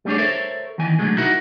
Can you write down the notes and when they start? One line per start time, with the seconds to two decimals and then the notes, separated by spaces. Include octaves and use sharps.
0.05 G3 A3 B3 D4 G#4 C#5
0.18 A4 A#4 C5 C#5 E5
0.78 E2 D#3 E3 G#5
0.99 B2 D3 D#3 F#3 G#3 A3
1.18 D#4 E4 F#4 A#4 F#5